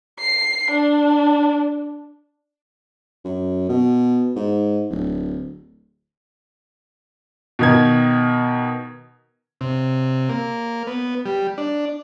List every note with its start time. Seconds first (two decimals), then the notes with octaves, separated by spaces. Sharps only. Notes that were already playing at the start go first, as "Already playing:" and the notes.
0.20 C7
0.71 D4
3.24 F#2
3.69 B2
4.36 G#2
4.90 D1
7.59 B2 D#3 G#6
9.61 C3
10.29 A#3
10.87 B3
11.26 G3
11.58 D4